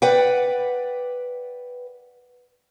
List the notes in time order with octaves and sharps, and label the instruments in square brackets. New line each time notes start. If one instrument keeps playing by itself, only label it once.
[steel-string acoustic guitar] B4 D5 F#5 G5